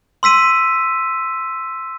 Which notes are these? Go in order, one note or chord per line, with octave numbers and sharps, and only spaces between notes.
C6 E6 B6 D#7